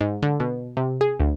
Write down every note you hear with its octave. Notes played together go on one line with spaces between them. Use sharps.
G#2
D3
B2
C3
G#4
D2